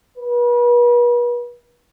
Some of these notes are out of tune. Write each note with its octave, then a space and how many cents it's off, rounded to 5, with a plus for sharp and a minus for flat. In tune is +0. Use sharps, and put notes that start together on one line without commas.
B4 -40